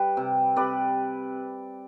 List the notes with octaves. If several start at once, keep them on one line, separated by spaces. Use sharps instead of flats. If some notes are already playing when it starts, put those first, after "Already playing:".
Already playing: G3 B4 D5
C3
C3 B4 D5